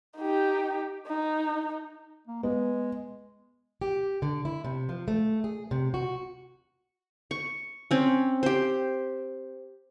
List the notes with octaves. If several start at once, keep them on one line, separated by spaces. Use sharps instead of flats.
D#4 G4
D#4
A#3
G#3 B3
G4
D3
E4
C3
F3
A3
G#4
C3
F#4
C#6
C4 C#4
G4 C5